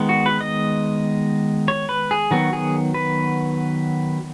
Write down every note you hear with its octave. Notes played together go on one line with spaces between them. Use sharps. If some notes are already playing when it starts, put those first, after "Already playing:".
Already playing: D#3 G#3 B3
F#4
B4
D#5
C#5
B4
G#4
D#3 F#3 B3 F#4
G#4
B4